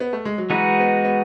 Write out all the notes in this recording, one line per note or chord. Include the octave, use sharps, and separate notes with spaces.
B3
A3
G#3
F#3
E3 G#3 D#4 F#4 B4
B3
B3